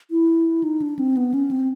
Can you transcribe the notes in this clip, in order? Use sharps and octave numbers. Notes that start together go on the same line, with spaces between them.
E4
D#4
D4
C4
B3
C#4
C4